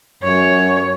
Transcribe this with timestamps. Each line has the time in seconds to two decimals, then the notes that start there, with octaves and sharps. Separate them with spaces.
0.23 F#2 C#5